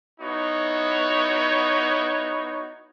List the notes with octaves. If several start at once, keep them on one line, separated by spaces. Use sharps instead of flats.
B3 D#4 E4 F#4 C#5